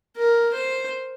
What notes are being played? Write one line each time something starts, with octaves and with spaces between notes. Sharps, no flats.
A#4
C5